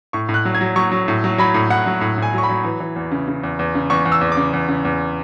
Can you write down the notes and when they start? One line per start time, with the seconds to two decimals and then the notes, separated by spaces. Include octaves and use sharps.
0.13 A2 C#6
0.29 A2
0.34 F#6
0.45 F#3
0.55 G#6
0.61 F#3
0.76 F#3 C#6
0.92 F#3
1.08 A2
1.24 F#3
1.38 F#3 B5
1.54 A2
1.70 A2 F#5
1.86 F#3
2.01 A2
2.18 A2 G#5
2.33 F#3 C#6
2.43 B5
2.49 F#3
2.64 E3
2.80 E3
2.96 E2
3.12 C#3
3.28 C#3
3.44 E2
3.59 E2
3.75 C#3
3.90 E2 C#6
4.06 E2
4.12 E6
4.21 E2
4.32 D6
4.37 C#3
4.53 E2
4.69 C#3
4.85 E2